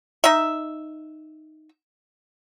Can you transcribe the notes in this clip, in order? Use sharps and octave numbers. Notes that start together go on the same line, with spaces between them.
D#4 E5